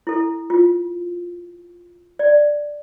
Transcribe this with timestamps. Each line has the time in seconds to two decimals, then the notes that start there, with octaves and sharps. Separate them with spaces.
0.07 E4 A4
0.50 F4
2.19 D5